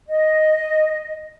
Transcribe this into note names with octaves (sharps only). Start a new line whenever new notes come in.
D#5